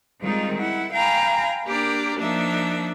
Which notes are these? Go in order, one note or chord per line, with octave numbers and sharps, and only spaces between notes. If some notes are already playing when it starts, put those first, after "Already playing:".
D#3 G3 G#3 C4 D#4 F4
E4 F#5
F5 G5 G#5 A#5 B5
A#3 D4 G4 A#4 D5
F3 A#3 D4 D#4 E5